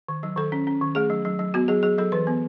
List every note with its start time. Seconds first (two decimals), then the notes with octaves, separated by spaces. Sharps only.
0.08 D#3
0.23 F#3
0.37 D#3 A4
0.52 C#4
0.67 C#4
0.81 D#3
0.95 A3 G#4
1.10 F#3
1.25 F#3
1.39 F#3
1.54 B3 F#4
1.68 F#3 G#4
1.83 F#3 G#4
1.98 F#3 A4
2.12 E3 B4
2.27 B3